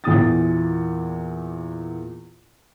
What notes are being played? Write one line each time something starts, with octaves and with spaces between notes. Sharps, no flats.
E2 A#2 D#6 A6